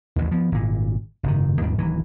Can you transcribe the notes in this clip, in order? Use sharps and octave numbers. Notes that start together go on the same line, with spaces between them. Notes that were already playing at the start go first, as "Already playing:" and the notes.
A1 D#2
F3 B3
G#1 A#2
F#1 G#2 D#3
D#2 G#2 D#3 G3
D1 D#3 E3 F#3